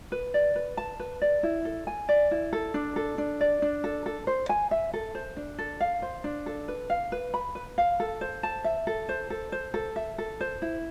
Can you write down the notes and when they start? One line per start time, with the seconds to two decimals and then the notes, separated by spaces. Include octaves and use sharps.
0.12 B4
0.34 D5
0.55 B4
0.77 A5
1.00 B4
1.21 D5
1.43 E4
1.65 A4
1.87 G#5
2.09 D5
2.31 E4
2.53 A4
2.74 D4
2.96 A4
3.18 D4
3.41 D5
3.62 D4
3.84 A4
4.06 A4
4.27 C5
4.49 G#5
4.71 E5
4.93 A4
5.15 C5
5.37 D4
5.58 A4
5.80 F5
6.02 C5
6.24 D4
6.46 A4
6.68 B4
6.90 F5
7.12 B4
7.34 B5
7.55 B4
7.78 F5
8.00 A4
8.21 C5
8.43 A5
8.64 E5
8.87 A4
9.09 C5
9.30 A4
9.52 C5
9.74 A4
9.96 E5
10.18 A4
10.41 C5
10.62 E4